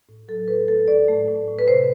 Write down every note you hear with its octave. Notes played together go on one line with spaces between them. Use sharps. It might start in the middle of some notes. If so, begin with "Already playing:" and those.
A2
F#3 A4
A2 B4
A3 A4
A2 D5
A3
A2
A2
B4
C3 C5